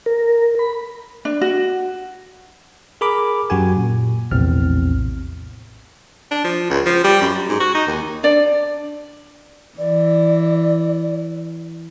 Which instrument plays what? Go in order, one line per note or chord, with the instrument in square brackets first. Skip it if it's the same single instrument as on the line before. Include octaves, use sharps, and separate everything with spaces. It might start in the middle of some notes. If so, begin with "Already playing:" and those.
[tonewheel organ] A#4
B5
[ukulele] D4
F#4
[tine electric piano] G#4 A#4 B5 D6
F#2 F#4 G4 G#5
A#2
A#1 E2 A2 C3 C4 F6
[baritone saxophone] D4
F3
C#2
F3
G3
F#2
F#3
G#2
F#4
D#4
D#2
[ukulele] D4 D5
[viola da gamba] E3 [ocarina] D5